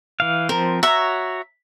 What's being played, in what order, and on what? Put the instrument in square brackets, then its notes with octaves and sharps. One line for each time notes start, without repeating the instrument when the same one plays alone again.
[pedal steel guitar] E3 F5
[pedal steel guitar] F3 C4 [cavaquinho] A#4
[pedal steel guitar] F#4 C#5 [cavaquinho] E5 A#5